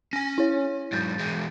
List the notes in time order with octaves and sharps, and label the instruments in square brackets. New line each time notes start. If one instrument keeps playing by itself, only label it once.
[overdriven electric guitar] C#4 G#5 [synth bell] A#6
[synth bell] E4 C#5
[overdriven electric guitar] G#2 F#3 [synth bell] G6 A6
[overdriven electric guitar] E3 G#3